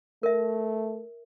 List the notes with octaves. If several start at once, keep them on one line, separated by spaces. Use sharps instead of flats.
A3 A#4 E5